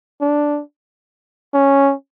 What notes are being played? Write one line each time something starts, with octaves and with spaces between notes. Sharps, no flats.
D4
C#4